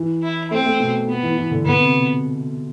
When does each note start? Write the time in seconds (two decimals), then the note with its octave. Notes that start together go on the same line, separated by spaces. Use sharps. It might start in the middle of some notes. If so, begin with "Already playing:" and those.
Already playing: E3
0.23 E4
0.51 A3 C4
0.65 A3
0.79 B2
1.08 B2 B3
1.23 E3
1.37 E3
1.51 D3
1.65 D3 B3
1.80 C3
1.94 B2